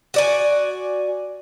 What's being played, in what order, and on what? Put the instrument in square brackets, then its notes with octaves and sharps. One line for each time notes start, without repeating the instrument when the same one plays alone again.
[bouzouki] F#4 D5 G#5